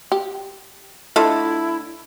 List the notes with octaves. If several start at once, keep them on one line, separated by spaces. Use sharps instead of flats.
G4
D3 A3 E4 F4 C#5 D#5